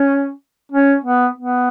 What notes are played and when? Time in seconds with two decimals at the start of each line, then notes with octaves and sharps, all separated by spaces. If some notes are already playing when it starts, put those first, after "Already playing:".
Already playing: C#4
0.72 C#4
1.04 B3
1.38 B3